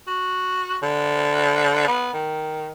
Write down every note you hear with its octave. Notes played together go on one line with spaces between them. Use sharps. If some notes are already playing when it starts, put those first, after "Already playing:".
F#4
D3
B3
D#3